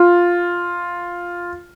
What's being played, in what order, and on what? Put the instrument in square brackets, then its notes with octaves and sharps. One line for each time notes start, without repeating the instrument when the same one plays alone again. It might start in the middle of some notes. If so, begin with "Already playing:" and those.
Already playing: [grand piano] F4